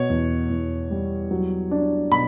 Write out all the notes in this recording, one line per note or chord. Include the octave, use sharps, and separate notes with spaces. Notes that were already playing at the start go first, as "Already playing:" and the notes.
Already playing: B2 C#5
E2
E2
G3
F#3
D4
B2 B5